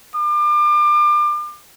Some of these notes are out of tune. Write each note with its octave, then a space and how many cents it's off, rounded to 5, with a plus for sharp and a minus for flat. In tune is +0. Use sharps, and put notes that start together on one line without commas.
D6 +35